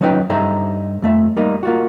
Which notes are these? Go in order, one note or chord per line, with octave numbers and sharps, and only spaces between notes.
F3 F#3 C#4 D#4 B4 G5
G2 D#4 A4 C5 E5 A#5
F2 A3 E5
G3 A#3 D#4
A#3 F4 F#4